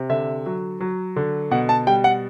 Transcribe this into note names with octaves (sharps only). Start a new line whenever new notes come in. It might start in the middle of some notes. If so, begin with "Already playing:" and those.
Already playing: C3
D3 E5
F#3
F#3
D3
B2 F#5
A5
G3 G5
F#5